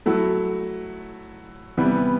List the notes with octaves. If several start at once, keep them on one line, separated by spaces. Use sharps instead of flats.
F#3 A3 E4
C3 E3 G3 B3